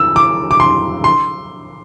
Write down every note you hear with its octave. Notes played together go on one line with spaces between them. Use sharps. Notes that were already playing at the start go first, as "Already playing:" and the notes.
Already playing: E6
D6
D6
C6
C6